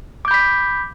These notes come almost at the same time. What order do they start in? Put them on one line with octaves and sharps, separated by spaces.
D6 G6 B5 B6